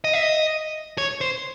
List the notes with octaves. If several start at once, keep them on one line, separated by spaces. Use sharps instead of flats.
D#5
E5
D#5
C#5
C5